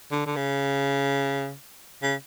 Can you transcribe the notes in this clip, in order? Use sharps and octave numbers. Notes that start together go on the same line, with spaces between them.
D3
D3
C#3
C#3